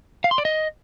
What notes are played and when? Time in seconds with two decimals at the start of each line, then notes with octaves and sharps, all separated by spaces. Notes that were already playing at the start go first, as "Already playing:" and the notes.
0.24 F5
0.31 C6
0.38 D5
0.45 D#5